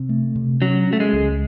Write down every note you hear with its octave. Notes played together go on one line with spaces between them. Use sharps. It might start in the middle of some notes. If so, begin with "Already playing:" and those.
Already playing: C3
A3
C3
F#3 C#4
C#4
A3
G#3
C#2